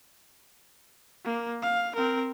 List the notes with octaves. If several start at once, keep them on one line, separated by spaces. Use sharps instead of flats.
A#3
F5
C4 A#4